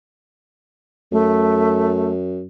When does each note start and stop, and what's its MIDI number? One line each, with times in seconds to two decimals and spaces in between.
1.12 2.46 42
1.12 2.12 57